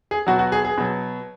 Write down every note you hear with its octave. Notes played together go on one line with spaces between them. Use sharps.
G#4
B2 F#3 F#4
F#4
G#4
G#4
B2 F#3